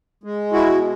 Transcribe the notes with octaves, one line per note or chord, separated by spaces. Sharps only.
G#3
E4 F#4
B2